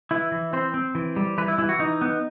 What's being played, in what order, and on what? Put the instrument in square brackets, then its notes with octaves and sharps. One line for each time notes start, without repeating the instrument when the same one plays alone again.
[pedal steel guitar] E3 E4
E3
C4 C5
C4
E3
G3
E3 B4
E4
E3 E4
F#4
E3 D#4
B3